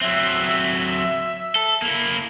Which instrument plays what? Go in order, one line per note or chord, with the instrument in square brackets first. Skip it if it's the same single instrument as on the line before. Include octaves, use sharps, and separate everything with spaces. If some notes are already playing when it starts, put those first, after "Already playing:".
[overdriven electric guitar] F#3 C4 [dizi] E5
[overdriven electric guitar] A4
A#3 E4